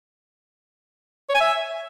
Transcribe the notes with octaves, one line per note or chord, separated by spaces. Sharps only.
C#5
G#5
E5